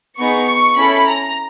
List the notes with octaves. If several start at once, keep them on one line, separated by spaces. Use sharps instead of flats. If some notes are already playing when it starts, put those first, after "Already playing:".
B3 D#4 G#4 C#6
C#6
C#4 E4 A4 B5
A#5